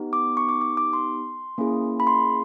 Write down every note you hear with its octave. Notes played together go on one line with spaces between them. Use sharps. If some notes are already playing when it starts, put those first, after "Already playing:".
Already playing: B3 D#4 G4
D6
C#6
D6
D6
D6
C6
A#3 C#4 E4 G#4
B5
C6